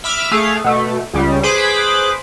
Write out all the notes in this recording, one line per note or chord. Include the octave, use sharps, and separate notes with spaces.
E5 B5 D6 F6
A3 G#4 F5
B2 A3
C#2 C#3 G3
G#4 B4 C5 B5 D6